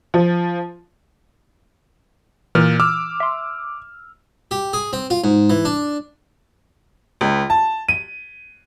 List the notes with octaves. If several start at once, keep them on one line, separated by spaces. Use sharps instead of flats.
F3
A#2 E3 F6
D6 E6 F6
E5 C6
G4
G#4
C4
F4
G#2
E3
D4
C#2
A5
D#7